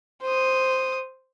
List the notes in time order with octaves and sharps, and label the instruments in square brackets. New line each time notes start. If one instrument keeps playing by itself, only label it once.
[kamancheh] C5 D#6